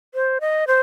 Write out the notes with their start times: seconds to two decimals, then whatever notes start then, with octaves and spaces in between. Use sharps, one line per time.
0.14 C5
0.41 D#5
0.67 C5